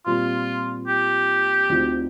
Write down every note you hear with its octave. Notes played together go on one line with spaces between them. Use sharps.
A#2 G3 C4 F4
G4
D2 D3 F3 C4 D#4